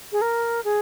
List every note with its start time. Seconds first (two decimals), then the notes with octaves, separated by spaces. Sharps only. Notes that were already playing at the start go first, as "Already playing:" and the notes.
0.12 G#4
0.21 A#4
0.64 G#4